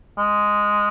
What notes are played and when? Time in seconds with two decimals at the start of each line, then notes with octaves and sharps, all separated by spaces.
0.18 G#3